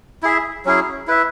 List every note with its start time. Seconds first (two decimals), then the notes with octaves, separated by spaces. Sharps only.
0.22 E4 G#4 E5
0.65 F#3 C#4 E4 G#4
1.07 E4 B4 E5